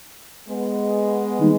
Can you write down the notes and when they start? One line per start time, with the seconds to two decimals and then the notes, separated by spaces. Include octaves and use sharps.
0.49 G#3 B3
1.39 D#3 G3 A#3 D#4